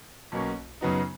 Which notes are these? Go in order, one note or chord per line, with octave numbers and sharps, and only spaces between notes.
B1 B2 A#3 C#4
F#2 C#3 F#3 B3 D#4